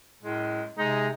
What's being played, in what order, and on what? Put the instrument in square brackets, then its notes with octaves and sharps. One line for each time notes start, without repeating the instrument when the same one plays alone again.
[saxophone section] F#2 G#3 [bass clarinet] A2
[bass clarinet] C3 [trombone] G#3 [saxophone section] D#4